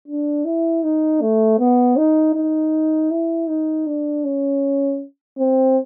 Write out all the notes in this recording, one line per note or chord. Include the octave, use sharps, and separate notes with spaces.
D4
E4
D#4
A3
B3
D#4
D#4
E4
D#4
D4
C#4
C4